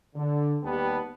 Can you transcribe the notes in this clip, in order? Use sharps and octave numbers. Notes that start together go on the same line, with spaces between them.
D3
D#2 G3 B3 G4 A5